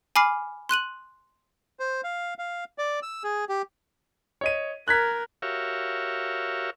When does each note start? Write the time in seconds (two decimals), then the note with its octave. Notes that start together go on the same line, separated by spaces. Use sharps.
0.16 G#5 B5 D6 F6 C7
0.69 C6 F#6 D#7 F#7
1.80 C5
2.04 F5
2.39 F5
2.78 D5
3.02 E6
3.24 G#4
3.49 G4
4.41 C#5 D#5 D#7
4.88 A#4 F#6 G#6 B6
5.42 F#4 G4 A#4 C#5 E5 F5